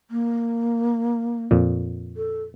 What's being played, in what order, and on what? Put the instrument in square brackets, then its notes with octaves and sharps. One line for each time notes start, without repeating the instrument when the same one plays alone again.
[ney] A#3
[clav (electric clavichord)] F2 A#2
[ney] A4